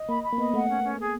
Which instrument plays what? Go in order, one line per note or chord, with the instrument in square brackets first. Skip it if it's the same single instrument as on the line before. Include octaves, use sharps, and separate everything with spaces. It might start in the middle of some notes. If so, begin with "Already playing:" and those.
Already playing: [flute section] D#5
[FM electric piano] A#3 [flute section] B5
[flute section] B5
[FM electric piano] A#3
[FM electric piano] B3 [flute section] D#5
[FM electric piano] A3 [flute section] F#5
[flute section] C#4
C#4
G#4